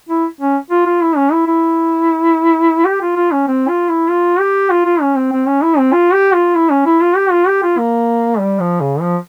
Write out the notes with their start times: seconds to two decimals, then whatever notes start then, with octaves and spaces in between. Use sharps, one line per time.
0.09 E4
0.41 C#4
0.70 F4
0.86 F4
1.01 E4
1.16 C#4
1.32 E4
1.47 E4
2.85 G4
3.01 F4
3.16 F4
3.31 C#4
3.48 C4
3.68 F4
3.89 E4
4.09 F4
4.40 G4
4.71 F4
4.85 F4
5.01 C#4
5.16 C4
5.32 C4
5.47 C#4
5.63 E4
5.78 C4
5.93 F4
6.13 G4
6.34 F4
6.55 E4
6.71 C#4
6.86 E4
7.01 F4
7.16 G4
7.31 F4
7.47 G4
7.63 F4
7.78 A#3
8.39 G3
8.60 F3
8.80 C#3
9.01 F3